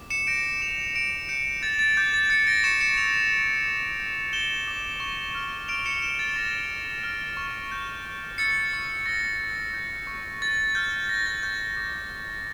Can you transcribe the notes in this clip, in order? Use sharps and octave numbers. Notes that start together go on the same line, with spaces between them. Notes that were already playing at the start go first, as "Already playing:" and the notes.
Already playing: D6
C#7 E7
G6 A#6 D7
D6 D7 F7
D6 D7 F7
G6 C#7 E7
G6 A6
A6
D6 G6
A6
G6 A6 C#7
A#6 D7
C#6 C#7 E7
C#7 E7
E6 D7 F7
C#6
D6
G6
G6 E7 G7
D6
C#6
F6
F6 D7 F7
C#7 E7
C#6 C#7 E7
A6
C#6 A#6
F6
F6
C#6
G6
C#6
E6 A6 C#7
C#6
C#6 A#6
G6
G6
C#6
C#6 A6
F6 G6
F6 A#6
A6
C#6 G6
A6
D6
G6